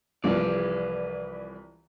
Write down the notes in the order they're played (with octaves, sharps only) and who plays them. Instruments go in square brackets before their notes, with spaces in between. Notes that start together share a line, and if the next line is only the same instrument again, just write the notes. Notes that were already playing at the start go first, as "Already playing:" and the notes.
[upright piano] C2 E3 F3 [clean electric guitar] B4 D5